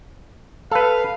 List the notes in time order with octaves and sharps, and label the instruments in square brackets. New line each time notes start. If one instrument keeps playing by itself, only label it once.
[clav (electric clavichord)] A4 B4 [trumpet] F5